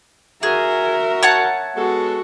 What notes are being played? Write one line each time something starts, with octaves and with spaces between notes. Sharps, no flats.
F#4 G#4 A#4 E5
C#5 F#5 A5
G#3 B3 F#4 A4